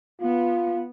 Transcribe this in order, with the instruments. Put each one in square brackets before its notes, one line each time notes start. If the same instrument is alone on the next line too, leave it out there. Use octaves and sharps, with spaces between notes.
[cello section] B3 [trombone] F4